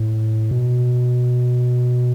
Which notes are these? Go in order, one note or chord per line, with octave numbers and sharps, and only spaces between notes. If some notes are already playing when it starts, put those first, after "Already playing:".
Already playing: A2
B2